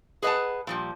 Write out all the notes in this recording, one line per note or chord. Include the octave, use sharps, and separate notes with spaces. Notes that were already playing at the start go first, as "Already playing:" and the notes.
G#4 B4 D#5 E5 F#5 A5
A#2 F3 G3